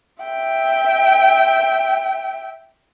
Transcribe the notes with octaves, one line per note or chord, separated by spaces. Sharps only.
E5 G5